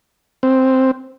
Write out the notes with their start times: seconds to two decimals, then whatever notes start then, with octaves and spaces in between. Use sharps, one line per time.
0.43 C4